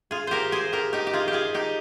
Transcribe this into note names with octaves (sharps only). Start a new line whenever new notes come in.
F4 G#4
G4 A#4 C5
G#4 C5
G4 A#4
D#4 G4
G4
F4 G#4
G4
F4 G#4
D#4 G4